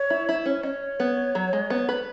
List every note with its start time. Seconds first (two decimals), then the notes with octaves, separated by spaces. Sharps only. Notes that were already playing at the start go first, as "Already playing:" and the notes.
Already playing: C#5
0.10 E4
0.29 E4
0.46 C#4
0.63 C#4 D#5
0.67 C#5
1.00 B3
1.35 F#3
1.53 G#3
1.70 B3
1.89 B4